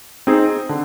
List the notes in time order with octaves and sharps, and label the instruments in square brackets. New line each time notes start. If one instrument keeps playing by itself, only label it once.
[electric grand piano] C4 D#4 G#4
D3